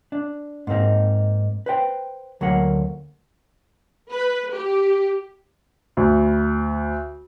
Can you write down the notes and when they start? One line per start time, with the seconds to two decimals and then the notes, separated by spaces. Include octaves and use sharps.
0.12 D4
0.67 G#2 A#3 C4 D#4
1.66 B4 C5 G5
2.41 D2 F#3 A#3 F#5
4.11 B4
4.54 G4
5.97 D2